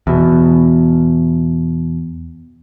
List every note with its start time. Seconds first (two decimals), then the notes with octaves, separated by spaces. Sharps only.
0.07 E2 B2